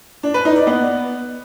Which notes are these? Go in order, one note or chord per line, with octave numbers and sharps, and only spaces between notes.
D4
B4
D#4
D5
B3